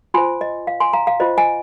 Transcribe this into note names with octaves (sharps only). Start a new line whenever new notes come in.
F4 C5 G#5 C6
D#5
F5
G#5 C6
F5 A#5
F5
F4 C5 D#5
D#5 G#5